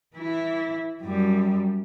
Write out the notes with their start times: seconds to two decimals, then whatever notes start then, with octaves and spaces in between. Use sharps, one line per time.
0.15 E3 E4
1.03 F#2 G3